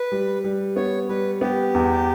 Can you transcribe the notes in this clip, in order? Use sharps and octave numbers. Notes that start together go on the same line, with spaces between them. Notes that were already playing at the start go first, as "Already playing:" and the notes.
Already playing: B4
G3
G3
B3 C#5
G3 B4
B3 G4
E2